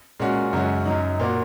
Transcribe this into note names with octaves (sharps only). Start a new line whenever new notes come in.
A#2 G#3 C#4 F#4
F#2 C#3 G#3 C#4 F#4
F#2 F#3 D#4
A#2 A#3 F#4